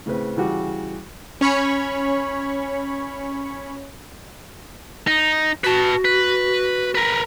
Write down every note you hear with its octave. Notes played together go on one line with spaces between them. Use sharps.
A2 C#3 C4 B4
C#3 E3 G3 F#4 G4
C#4 C#5 B5 C#6
D#4
F#4 B4 A5
B4
A#4 B4